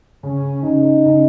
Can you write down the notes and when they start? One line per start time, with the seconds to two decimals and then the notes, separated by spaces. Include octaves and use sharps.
0.23 C#3 C#4
0.63 C#3 D#4
1.06 C#3